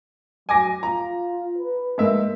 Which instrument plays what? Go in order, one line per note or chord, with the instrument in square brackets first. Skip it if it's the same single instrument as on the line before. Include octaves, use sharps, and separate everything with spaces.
[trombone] F#3 [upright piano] G#5 D6 A#6
[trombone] F4 [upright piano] A#5
[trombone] B4
[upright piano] G#2 A#3 E5